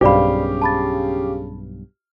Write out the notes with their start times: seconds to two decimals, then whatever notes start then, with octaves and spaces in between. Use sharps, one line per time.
0.01 B1 G2 C#3 G4 C5 D5 F5 B5
0.62 A5 B5 A6